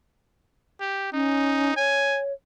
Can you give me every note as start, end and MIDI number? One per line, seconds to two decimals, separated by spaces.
0.80 1.12 67
1.13 1.73 61
1.13 1.75 63
1.76 2.33 73
1.76 2.20 80